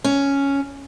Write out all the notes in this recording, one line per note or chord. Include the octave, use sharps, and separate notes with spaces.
C#4